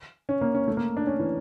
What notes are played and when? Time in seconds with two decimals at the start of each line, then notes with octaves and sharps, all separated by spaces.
0.29 C#4
0.41 A#3
0.55 C#4
0.68 A3
0.77 A#3
0.97 D4
1.07 C#4
1.19 E3